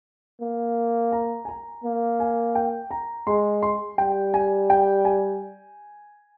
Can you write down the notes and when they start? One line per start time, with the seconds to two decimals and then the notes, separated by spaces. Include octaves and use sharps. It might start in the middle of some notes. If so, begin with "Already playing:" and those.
0.41 A#3
1.12 A#5
1.45 G#5
1.49 A#5
1.84 A#3
2.20 G#5
2.55 G5
2.91 A#5
3.27 G#3 C6
3.63 C6
3.98 G3 G5
4.34 G#5
4.70 G5
5.05 G#5